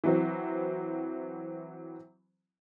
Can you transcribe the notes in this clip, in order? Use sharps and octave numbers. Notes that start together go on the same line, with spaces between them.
E3 F#3 C4